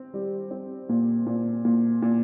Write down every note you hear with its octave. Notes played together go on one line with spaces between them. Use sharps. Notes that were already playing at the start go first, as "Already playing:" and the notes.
Already playing: C4
G3
C4
A#2
A#2
A#2
A#2